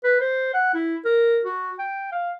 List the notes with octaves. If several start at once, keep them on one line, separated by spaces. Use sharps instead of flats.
B4
C5
F#5
E4
A#4
F#4
G5
F5